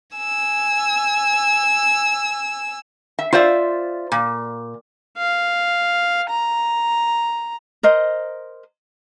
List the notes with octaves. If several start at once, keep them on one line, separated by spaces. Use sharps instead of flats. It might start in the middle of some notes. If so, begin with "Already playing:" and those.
G#5 E6
E5
F4 C5 D5 E5
A#2
F5
A#5
A#4 C5 D#5